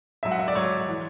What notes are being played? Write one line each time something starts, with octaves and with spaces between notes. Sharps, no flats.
G#2 F#3 E5
F#5
E5
D5
G#2 F#3 C#5
E3